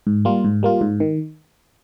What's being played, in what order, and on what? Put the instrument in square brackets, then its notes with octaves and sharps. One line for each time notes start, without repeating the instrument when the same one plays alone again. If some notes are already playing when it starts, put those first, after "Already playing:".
[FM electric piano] G#2
G3 A#3 F4
G#2
G3 A#3 F4
G#2
D#3